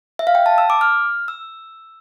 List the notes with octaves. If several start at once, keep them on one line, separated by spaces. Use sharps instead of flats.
E5
F5
G5
A5
E6
D6
F6
E6